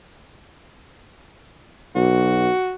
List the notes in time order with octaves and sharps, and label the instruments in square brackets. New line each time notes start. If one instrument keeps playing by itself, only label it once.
[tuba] B1 [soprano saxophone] F#4